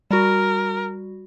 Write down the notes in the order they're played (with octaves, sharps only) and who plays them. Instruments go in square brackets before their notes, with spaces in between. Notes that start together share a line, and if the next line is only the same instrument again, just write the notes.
[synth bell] G3 F#4 [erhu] A#4